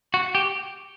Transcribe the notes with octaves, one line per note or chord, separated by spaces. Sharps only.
F#4
G4